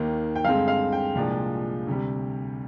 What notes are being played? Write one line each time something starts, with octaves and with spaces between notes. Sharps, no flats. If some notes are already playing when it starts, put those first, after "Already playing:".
Already playing: D#2 D#3 A#3
G5
G2 D3 G#3 C4 F5
F5
G5
C2 A#2 F3 G#3 D4
D2 C3 G3